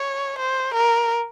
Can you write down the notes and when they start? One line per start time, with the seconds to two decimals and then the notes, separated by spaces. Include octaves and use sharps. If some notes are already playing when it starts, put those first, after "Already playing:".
Already playing: C#5
0.38 C5
0.74 A#4